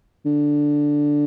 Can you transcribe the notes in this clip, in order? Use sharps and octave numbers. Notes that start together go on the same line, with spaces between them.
D3